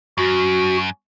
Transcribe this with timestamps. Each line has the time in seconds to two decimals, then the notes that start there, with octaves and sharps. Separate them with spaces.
0.18 F#2 F#4